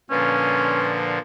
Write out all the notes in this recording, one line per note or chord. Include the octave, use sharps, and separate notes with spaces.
A#2 D3 F3 C#4 B4